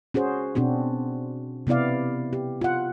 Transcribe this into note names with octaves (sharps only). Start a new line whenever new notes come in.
C#4 F#4 G#4 C5
B2 C4 D4 F#4
C3 B3 E4 D5 F5
G4
F4 F#5